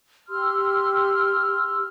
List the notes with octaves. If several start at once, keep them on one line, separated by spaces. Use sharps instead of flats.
G4 C6 E6 F6